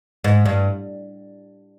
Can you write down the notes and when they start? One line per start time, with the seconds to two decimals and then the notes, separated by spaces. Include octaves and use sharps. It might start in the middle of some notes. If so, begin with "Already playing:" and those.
0.24 G#2
0.46 G2